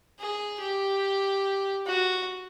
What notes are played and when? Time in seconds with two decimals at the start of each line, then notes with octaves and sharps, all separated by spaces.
0.19 G#4
0.61 G4
1.86 F#4